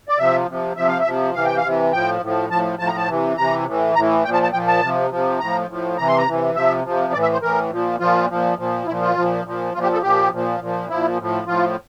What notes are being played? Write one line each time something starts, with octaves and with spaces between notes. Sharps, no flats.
D5
C3 F3 E5
C3 F3
C3 F3 E5
F5
E5
C3 F3
C3 E3 F5
G5
F5
C3 E3
A2 F3 G5
A2 F3
A2 F3 A5
A2 F3 A5
A#5
A5
C3 E3
C3 E3 A#5
A2 E3
A2 E3 A#5
A#2 F3 G5 A5
A5
A#2 F3 G5
A5
C3 F3
C3 F3
A2 F3 A#5
A2 F3
C3 E3 A#5
C6
A#5
C3 E3
C3 F3 E5
C3 F3
A2 E3 D5
E5
C5
A2 E3 A#4
A#2 F3
A#2 F3 F4
A#2 F3
A#2 F3
A#2 F3 E4
F4
A#2 F3
A#2 F3
A#2 F3 F4
G4
A4
A#2 F3 G4
A#2 F3
A#2 F3
A#2 F3 E4
A2 F3
A2 F3 F4